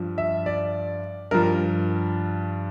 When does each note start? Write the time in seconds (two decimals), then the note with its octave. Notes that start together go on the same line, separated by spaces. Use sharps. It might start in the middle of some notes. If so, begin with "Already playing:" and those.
Already playing: G2 F3
0.18 E5
0.46 D5
1.31 G2 F3 A#4